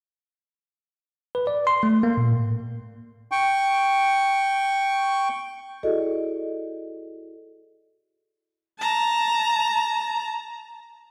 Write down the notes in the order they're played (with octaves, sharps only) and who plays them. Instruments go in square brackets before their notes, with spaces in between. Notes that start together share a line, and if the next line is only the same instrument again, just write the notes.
[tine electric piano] B4
D5
C6
A3
A#3
A#2
A2
[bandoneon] G5 C#6
[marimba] E4 F#4 G#4 A4 D5 D#5
[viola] A5 A#5